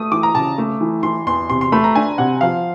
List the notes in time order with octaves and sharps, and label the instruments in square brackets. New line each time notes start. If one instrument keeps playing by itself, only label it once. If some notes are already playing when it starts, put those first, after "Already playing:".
Already playing: [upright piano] A3 [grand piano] D#6
[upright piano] E3 [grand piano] D6
[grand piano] A#5
[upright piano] C#3 [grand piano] A5
[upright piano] A3
E3
[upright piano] E3 [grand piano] C6
[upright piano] E2 [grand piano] C6
[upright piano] C3 [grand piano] C6
[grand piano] C6
[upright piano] A3 [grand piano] B5
[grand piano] A#5
[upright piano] D4 [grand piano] G#5
[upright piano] C3 [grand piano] F#5
[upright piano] F3 [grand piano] F5